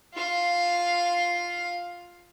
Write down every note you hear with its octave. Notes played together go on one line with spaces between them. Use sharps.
F4 F5